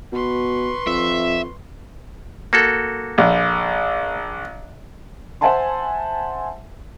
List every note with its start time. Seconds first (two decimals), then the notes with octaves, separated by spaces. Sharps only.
0.12 B2 B4 C6 C#6
0.87 F2 E5
2.53 A#3 F#4 A4
3.18 A#1
5.41 C5 E5 F#5 G#5 A5 C6